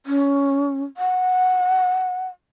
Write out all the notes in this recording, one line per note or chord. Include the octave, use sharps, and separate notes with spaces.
C#4
F#5